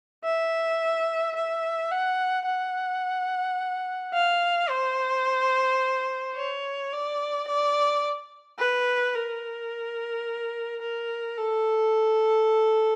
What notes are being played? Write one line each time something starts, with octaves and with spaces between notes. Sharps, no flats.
E5
E5
F#5
F#5
F5
C5
C#5
D5
D5
B4
A#4
A#4
A4